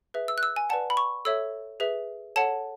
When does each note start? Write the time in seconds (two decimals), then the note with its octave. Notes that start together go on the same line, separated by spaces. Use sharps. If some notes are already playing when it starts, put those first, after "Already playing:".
0.14 G#4 B4 E5
0.28 E6
0.38 F#6
0.43 E6
0.56 G#5
0.70 B4 D5 F#5 A5
0.90 B5
0.97 C#6
1.25 A4 C#5 E5 E6
1.80 G#4 B4 E5
2.36 A4 C#5 F#5 A5